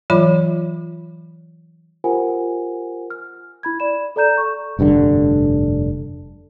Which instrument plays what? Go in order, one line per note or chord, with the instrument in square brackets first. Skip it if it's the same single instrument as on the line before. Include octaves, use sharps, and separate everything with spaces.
[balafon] E3 F#3 F4 C#5 B5
[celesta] F4 G4 A#4 C5 F#5 G#5
F6
E4 B5 G#6
D5 B5 E7
A4 D5 A#5 G6 E7
C#6
[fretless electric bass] F1 G2 B2 D3